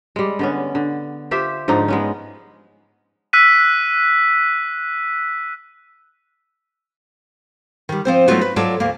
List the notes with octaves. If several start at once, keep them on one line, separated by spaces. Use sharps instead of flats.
G3 G#3
D3 B3 C#4
D3
F4 G4 C5 E5
G#2 D3 F3 D#4
G#3 B3 C#4
E6 F#6 B6 D#7
D#3 G3
F3 C4 C5
F#3 A3 B3 D#4 F4 F#4
B4
F#3 F4 A4 C#5 D5
D2 A#3